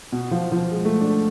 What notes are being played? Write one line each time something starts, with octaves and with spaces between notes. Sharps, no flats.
B2
F3
F3
G#3
A3
D4